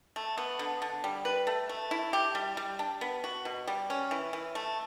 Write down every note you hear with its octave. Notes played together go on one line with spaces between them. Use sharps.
A3
B3
D3
D3
G3
B4
A3
A3
E4
G4
G3
G3
D4
B3
F#4
B2
G3
C#4
E3
E3
A3